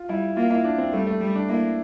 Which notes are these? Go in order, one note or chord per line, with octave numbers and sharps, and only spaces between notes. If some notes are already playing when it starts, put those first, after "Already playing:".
Already playing: F4
G3 E4
A#3 F4
E4
D4
C4
G3 A3
A3
G3
D4
A#3 E4